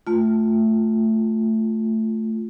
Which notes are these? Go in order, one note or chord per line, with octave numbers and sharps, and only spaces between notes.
A3 F4